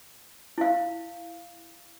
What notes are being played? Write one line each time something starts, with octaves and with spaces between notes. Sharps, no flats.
E4 F5